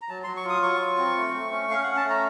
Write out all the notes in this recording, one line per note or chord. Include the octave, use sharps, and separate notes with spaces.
A#5
F#3 A5
F#3 C6
C#6
F4 D#6
F#3 C#6
F4
C4
A3
A3
C#4
C#4 F5
C#4 F#5
A5
A3
A#5